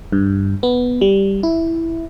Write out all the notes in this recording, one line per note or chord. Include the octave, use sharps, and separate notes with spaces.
G2
B3
G3
E4